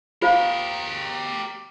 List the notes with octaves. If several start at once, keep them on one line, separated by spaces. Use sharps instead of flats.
F4 G4 A#4 C5 F5